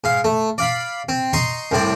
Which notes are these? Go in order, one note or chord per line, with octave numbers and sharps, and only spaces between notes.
G#2 F5
A3
D5 F5 B5
C4
D#4 A#5 C6 C#6
C2 A2 C4 D5